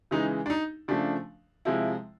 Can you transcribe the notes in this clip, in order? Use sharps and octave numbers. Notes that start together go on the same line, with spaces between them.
C#3 E3 G#3 D#4
D4
D#4
C#3 F3 A3 D4
C3 F3 G#3 E4